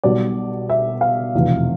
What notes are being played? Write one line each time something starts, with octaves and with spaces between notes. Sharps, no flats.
B1 B2 G3 D5
E5
F5
F1 E2 B2